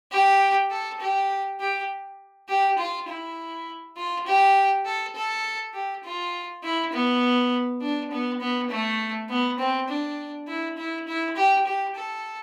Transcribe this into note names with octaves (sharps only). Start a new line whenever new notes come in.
G4
A4
G4
G4
G4
F4
E4
F4
G4
A4
A4
G4
F4
E4
B3
D4
B3
B3
A3
B3
C4
D4
E4
E4
E4
G4
G4
A4